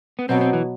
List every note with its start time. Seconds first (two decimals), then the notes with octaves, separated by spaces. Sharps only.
0.19 B3
0.29 B2 F#3 B3 C4
0.41 C4
0.53 E3